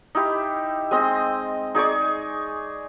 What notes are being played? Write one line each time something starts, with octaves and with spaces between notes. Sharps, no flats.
D#4 E4 G4
G#3 C4 D#5
D#4 G#4 D5 C#6